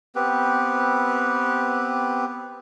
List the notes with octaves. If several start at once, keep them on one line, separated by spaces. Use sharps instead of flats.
B3 C4 G4 B4